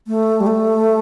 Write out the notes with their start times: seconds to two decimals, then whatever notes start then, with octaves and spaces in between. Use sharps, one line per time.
0.07 A3
0.40 G3
0.46 A3